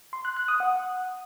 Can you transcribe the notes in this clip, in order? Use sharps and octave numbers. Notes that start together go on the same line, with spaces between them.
C6
F#6
F#6
D#6
F#5